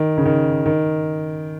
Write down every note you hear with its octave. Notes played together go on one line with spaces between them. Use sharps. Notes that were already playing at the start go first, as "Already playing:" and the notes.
Already playing: D#3
C#3
D#3
D#3